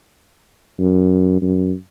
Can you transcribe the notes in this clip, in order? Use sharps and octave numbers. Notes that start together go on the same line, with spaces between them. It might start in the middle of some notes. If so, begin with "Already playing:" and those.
F#2
F#2